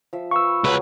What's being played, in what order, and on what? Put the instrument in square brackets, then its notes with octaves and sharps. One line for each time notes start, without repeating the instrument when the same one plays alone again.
[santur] F3 E5
[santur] B4 F5 [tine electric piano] C#6 E6
[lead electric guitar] C#2 B4 [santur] F#3 G#4